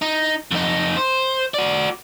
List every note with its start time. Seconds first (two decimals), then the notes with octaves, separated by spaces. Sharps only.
0.02 D#4
0.51 F2 D#4
0.97 C5
1.54 F#4 D5